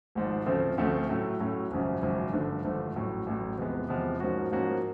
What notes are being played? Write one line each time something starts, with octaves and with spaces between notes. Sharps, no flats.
G#1 G#2 F3
D2 C#3 F3 A3 C4
D2 C#3 F3 A3 C4
A2 F#3 A3 C#4
A2 F#3 A3 C#4
G#1 F#2 C#3 F3
G#1 F#2 C#3 F3
G#1 G2 D3 F3 A3
G#1 G2 D3 F3 A3
A1 A2 F#3
A1 A2 F#3
E2 C3 F3 G#3 B3
E2 C3 F3 G#3 B3
G#2 F3 A#3 C#4 F#4
G#2 F3 A#3 C#4 F#4